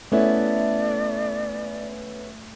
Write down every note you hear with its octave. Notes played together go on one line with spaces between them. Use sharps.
A3 B3 C#4 E4 D5